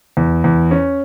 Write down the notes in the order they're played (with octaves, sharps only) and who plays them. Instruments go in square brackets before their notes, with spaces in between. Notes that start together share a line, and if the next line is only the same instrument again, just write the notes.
[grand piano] E2
E2
C#4